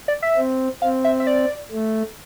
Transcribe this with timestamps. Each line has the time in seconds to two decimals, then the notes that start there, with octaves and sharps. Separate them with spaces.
0.08 D5
0.22 E5
0.37 C4
0.82 C4 F5
1.05 E5
1.20 E5
1.27 D5
1.72 A3